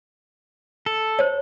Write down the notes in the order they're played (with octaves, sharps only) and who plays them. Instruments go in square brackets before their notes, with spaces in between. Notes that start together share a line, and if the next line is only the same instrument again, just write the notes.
[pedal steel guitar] A4
[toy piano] C5 C#5